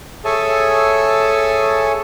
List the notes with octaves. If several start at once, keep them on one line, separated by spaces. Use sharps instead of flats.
G#4 A4 C#5 E5 G#5 A5